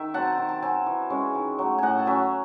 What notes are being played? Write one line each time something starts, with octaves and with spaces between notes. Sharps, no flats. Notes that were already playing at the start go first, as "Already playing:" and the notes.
Already playing: D#3 E5
F#3 C4 F#5 A5
D#3
A5
F#3 C4 E5 G#5
E3
G#3 C#4
D#3
F#3 A3
A2 D#5 F#5 G#5
A5
F#3 C#4 E5 G#5